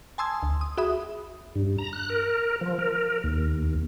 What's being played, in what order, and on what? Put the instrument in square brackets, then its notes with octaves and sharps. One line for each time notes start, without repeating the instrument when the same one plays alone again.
[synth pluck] G#5 A5 C6 D#6 E6 G#6
D2
D#6
F#4 G#4 E5 B5 D#6
[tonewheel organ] G2
A#5
F#6
A#4
F3
A#4
D#2